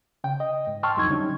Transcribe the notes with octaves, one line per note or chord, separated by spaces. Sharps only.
C#3 G5
D#5
G#2
G5 A5 C6 C#6 E6 F6
C2 F2 F#3 D#4 C#6 G#6
D3 G3 C#4 D#4